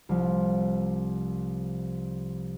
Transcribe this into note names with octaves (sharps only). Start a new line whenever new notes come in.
C2 F3